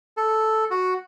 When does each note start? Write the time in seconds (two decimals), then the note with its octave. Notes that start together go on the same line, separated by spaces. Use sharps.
0.17 A4
0.71 F#4